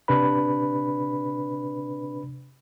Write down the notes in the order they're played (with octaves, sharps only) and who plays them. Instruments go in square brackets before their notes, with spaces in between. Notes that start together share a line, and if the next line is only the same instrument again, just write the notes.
[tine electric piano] C3 D4 B4 B5